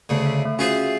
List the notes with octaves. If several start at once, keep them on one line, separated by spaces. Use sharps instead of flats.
D2 C#3
E5
A3
C#4 F4 F#4 G#4 C5 E5